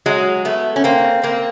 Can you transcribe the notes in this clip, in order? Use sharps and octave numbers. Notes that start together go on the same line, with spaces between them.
F#3 G#3
A3 B3
C#4
A#3 C4
A#3 C4